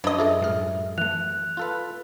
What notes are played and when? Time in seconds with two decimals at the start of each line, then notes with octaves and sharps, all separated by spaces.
0.04 F#2 D4 D#5 B5 G#6
0.18 F4 G#4 A4 E5
0.41 A2 G#3 F6
0.98 E3 A3 F#6 F7
1.57 F4 A4 B4